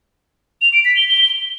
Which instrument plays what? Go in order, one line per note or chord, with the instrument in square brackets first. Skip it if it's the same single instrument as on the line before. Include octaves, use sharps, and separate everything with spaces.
[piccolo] F7
D7
B6
G7
G7